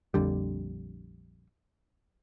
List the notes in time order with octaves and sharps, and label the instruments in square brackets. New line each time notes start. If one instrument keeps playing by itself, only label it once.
[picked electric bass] A#1 F2 D3 G3